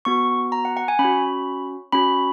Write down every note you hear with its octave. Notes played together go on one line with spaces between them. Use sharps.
B3 F#4 C#6
A#5
F#5
F#5
G#5
C#4 B5
F#4
C#4 F#4 B5